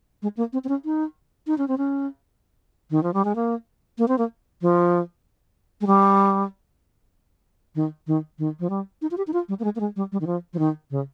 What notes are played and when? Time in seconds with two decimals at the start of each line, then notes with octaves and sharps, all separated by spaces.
0.22 G#3
0.37 A#3
0.53 C4
0.64 C4
0.69 C#4
0.85 D#4
1.47 D#4
1.58 C#4
1.68 C4
1.78 C#4
2.91 D#3
3.03 F3
3.14 G3
3.25 G#3
3.35 A#3
3.98 A#3
4.08 C4
4.18 A#3
4.62 F3
5.81 G#3
5.87 G3
7.75 D#3
8.07 D#3
8.39 D#3
8.60 F3
8.70 G3
9.02 D#4
9.11 F4
9.17 G4
9.27 D#4
9.33 F4
9.49 G3
9.60 A#3
9.64 G#3
9.76 A#3
9.80 G#3
9.96 G3
10.12 G3
10.21 D#3
10.27 F3
10.53 F3
10.59 D#3
10.91 C#3